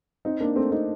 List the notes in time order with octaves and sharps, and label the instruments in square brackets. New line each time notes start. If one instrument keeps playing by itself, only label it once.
[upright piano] C4 D#4
A#3 D4
A3 C4
C4 D#4